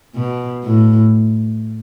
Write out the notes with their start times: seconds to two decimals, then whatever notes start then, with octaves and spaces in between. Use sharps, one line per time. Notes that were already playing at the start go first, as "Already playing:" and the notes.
0.15 B2
0.63 A2